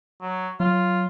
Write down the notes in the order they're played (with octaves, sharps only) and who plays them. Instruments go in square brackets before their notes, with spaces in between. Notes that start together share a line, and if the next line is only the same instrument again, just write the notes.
[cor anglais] F#3
[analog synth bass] F#3 [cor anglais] F4